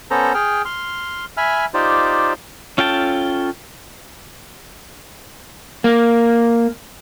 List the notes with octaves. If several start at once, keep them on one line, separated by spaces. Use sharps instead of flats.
B3 C#4 A4 C5 A#5
G#4 G5 F6
C6 F6
E5 G#5 B5 F6
D#4 F4 G4 C5 D5
C#4 F4 A4 G5 A5
A#3